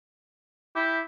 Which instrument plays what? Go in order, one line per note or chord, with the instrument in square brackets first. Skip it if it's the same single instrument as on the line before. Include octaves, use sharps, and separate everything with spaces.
[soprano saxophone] E4 [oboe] G4